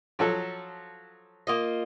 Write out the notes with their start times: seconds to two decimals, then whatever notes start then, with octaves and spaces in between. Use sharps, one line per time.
0.19 F3 F#3 A4
1.47 A#3 F4 D#5